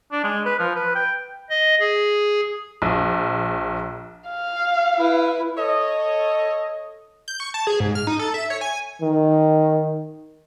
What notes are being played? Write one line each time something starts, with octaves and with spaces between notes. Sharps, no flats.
D4
G#3
B4
F3
B4
G5
D#5
G#4
A#1
F5
E4 B4
A4 C#5 D#5
G6
C#6
A5
G#4
G#2
F6
D#4
A4
E5
C#5
G#5
D#3